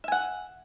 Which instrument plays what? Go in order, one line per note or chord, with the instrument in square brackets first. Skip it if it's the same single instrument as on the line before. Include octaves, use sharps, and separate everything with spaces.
[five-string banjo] E5
G#5
F#5